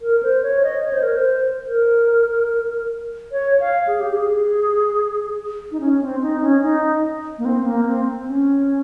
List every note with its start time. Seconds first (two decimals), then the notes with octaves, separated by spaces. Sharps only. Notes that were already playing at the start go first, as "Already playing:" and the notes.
0.02 A#4
0.23 C5
0.43 C#5
0.63 D#5
0.84 C#5
0.93 C5
1.03 A#4
1.12 C5
1.67 A#4
3.32 C#5
3.60 F5
3.87 G#4
4.00 G4
4.13 G#4
5.72 D#4
5.80 C#4
6.01 C4
6.22 D#4
6.42 C#4
6.63 D#4
7.38 A#3
7.45 C4
7.62 C4
7.66 A#3
7.86 C4
8.08 C4
8.28 C#4